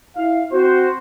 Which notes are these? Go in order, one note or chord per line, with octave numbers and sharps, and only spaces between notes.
E4 F5
C4 F#4 C5